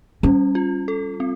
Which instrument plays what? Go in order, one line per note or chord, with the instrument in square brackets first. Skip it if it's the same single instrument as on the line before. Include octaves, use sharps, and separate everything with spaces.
[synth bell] G3 [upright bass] C#4
[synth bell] F4
A4
C4